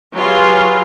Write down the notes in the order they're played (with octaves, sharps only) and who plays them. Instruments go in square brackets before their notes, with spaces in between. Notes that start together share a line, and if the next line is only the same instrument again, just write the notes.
[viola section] F#3 F4 [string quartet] G4 G#4 B4